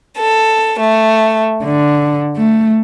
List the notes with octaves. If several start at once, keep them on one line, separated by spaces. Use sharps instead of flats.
A4
A3
D3
A3